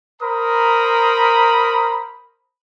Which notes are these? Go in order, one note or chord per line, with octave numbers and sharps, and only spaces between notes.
A#4 C5 A#5 B5 D#6